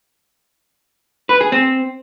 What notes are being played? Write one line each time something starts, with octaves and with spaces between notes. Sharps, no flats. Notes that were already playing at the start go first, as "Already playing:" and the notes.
B4
G#4
C4